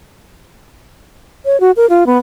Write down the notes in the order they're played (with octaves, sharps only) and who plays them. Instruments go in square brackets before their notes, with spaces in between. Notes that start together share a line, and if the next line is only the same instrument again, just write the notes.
[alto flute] C#5
F#4
A#4
F4
B3